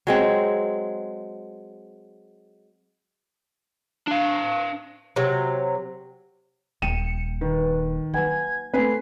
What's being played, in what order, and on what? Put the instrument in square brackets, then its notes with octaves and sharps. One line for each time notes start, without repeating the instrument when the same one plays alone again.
[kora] F#3 G#3 C4
[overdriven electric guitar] D4 F5
[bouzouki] C3 F#3
[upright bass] D#1 A#3 [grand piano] G5 D#7 E7 [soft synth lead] C#7
[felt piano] D#3 [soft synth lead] B4
[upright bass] F#3 A#3 [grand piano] B4 F#5 G#5 [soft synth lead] G#6
[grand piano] A3 C4 [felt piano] B4 G#5 [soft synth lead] C7